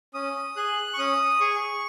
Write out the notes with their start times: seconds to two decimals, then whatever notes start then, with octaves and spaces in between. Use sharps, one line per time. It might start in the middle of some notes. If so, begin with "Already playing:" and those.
0.14 C#4 D#6
0.56 G#4 F#6
0.94 C#6
0.99 C#4 D#6
1.40 G#4 C#6